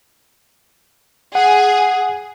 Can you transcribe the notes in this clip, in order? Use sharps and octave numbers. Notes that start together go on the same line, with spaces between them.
G#4 F#5